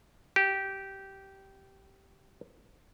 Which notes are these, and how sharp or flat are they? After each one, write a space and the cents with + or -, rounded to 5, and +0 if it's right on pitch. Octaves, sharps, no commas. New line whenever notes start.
G4 -15